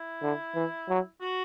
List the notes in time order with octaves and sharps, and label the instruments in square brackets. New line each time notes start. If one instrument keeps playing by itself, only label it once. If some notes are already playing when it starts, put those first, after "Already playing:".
Already playing: [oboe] E4
[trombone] D3
E3
F#3
[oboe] F#4